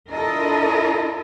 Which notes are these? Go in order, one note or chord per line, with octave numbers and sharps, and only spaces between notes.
D4 E4 F4 A4 A#4 D#5